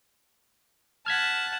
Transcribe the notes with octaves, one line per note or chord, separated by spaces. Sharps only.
F#5 A5 F6 G#6 B6